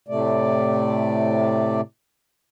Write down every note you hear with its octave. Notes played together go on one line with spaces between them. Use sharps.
A2 C3 A3 D5